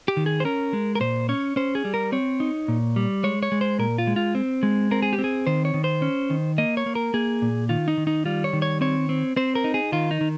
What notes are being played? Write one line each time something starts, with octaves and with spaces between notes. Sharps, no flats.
G4
D#3
G#4
C5
C#4 A#4
G#3
A#4
A#2 C5
C#4 C#5
C#4 C5
G#4
G3
A#4
C4 C#5
D#4
A#2
G3
G#3 C#5
C#5
G#3
C5
A#2 A#4
F4
G#3
F4
C4
G#3
C4 A#4
G#4
G4
C4
G#4
D#3 C5
C#5
D#3
C5
C#4
D#3
A#3 D#5
C#5
A#3
A#4
A#3 G#4
A#2
D#3 F4
D#4
D#3
D#4
G3 F4
C#5
D#3
C#5
C4 C#5
C4
C4 C5
A#4
D#4
G#4
D#3 F4
D#4
D#3